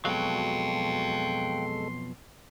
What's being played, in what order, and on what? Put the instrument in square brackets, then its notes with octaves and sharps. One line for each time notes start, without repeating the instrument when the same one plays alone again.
[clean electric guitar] F2 B2 F#3 [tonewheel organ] G#3 A4 [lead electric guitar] F5 G5 [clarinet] C6